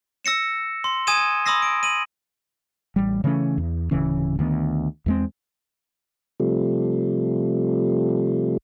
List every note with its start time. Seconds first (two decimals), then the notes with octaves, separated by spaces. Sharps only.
0.25 E6 A#6 C#7 E7
0.84 C6
1.07 G#5 D#6 G#6 D#7 E7 G7
1.46 B5 C6 D#6 E6 A#6 C7
1.62 D7
1.83 D#7 F#7
2.96 A1 G3
3.24 C#3 E3 A3 C#4
3.58 E2
3.91 D1 C#3 E3 C#4
4.39 D2 D#3 B3
5.06 E2 G#3 C4
6.40 C3 F3 G3 A3